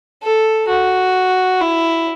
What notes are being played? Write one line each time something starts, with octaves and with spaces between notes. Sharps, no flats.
A4
F#4
E4